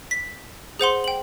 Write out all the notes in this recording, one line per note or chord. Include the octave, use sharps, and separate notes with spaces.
B6
G#4 C5 F#5 C6
G5 F#7